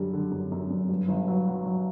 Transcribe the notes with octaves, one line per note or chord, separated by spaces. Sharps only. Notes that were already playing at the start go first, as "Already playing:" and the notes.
Already playing: F#2 D3 G3
D3
F#2
F#2
F#2
G2
G1
F#3
F#3
F#3